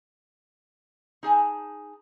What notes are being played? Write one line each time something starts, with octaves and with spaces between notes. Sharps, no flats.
D#4 G#4 G#5 A5